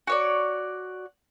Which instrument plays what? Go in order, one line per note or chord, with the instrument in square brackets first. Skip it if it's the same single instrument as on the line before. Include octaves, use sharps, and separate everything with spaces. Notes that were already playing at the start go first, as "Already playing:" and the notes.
[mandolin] F#4 C#5 D5